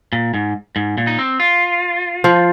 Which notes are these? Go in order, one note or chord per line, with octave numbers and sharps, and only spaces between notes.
A#2
G#2
G#2
A#2
D#4
C4
F4
F3